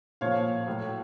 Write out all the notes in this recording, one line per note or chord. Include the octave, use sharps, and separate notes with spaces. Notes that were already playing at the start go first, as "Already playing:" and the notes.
A#2 F3 C#5 F5
A2 F#3